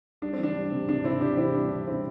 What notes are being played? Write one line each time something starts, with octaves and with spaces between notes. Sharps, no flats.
G3 D4
C4
E3 D4
G3
C3
C3 D4
C3 C4 E4
C3 D4 G4
E3 C4 E4
G3 D4
C3 D4
G3 C4 E4